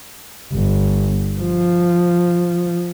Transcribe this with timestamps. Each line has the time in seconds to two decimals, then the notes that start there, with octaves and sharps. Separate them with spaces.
0.54 G1
1.40 F3